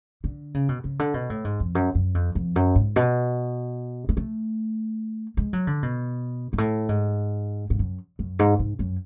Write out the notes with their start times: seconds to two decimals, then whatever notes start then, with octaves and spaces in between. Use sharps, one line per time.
0.24 D3
0.54 C#3
0.69 B2
0.84 C#3
0.99 D3
1.14 B2
1.30 A2
1.45 G#2
1.60 F2
1.75 F#2
1.95 F#2
2.15 F2
2.35 F2
2.56 F#2
2.75 G#2
2.96 B2
4.09 G#3
4.17 A3
5.37 G#3
5.53 F#3
5.67 D3
5.83 B2
6.53 G#2
6.58 A2
6.89 G#2
7.70 G#2
7.79 F#2
8.19 F#2
8.39 G#2
8.59 G#2
8.79 F#2